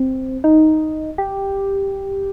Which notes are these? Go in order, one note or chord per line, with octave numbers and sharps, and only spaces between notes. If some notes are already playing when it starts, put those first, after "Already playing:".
Already playing: C4
D#4
G4